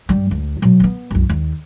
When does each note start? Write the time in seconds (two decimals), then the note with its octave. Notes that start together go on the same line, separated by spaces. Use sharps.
0.09 G2 G3
0.31 D2
0.62 B2 F#3
0.80 B3 C4
1.11 C2 F#2
1.29 D#2